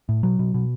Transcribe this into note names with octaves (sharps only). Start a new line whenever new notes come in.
A2
B2 F#3
B2
B2